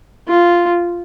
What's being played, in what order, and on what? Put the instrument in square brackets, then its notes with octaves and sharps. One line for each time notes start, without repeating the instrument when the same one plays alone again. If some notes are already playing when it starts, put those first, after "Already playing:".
[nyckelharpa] F4